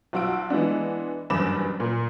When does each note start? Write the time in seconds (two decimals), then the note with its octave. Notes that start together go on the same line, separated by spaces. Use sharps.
0.13 B1 F4 F#4 E6 D7
0.50 E3 G#3 B3 D4
1.30 F#1 E2 G2 B5 D6 E7
1.80 A#2